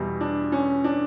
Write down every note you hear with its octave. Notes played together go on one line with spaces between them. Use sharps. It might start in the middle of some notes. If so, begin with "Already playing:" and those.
Already playing: E2 B2 G3
D4
C#4
D4